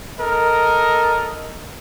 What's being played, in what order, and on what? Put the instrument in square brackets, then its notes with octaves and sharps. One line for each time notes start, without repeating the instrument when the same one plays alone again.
[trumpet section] A4 A#4 D#5